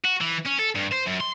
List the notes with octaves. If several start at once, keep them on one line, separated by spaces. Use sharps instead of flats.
F#4
E3
C#4
A4
G2
C5
F#2
C6